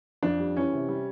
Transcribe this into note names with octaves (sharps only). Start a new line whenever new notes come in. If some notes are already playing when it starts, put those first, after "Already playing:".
F2 D4
G3
E3 C#4
C3
G3